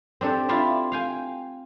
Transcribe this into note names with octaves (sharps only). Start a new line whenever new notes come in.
C4 D4 G4 A4
E4 F4 D5 E5
F5 G5 G#5